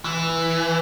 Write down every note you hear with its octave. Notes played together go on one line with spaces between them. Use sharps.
E3